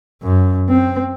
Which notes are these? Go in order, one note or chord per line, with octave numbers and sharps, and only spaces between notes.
F#2
C4